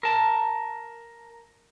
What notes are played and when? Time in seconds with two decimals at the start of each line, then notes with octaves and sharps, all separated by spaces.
0.03 A#4 A5